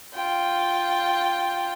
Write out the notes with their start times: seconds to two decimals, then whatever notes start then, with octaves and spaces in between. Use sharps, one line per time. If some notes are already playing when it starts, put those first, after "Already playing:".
0.14 F4 G5